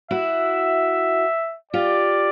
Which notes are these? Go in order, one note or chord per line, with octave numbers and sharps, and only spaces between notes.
E4 F#4 E5
F4 G4 D5